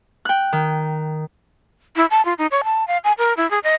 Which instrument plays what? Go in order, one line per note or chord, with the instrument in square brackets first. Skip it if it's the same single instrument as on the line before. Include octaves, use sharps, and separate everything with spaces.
[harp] G5 F#6
D#3
[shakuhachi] E4
A5
F4
D#4
C#5
A5
F5
G#5
A#4
E4
G#4
D#5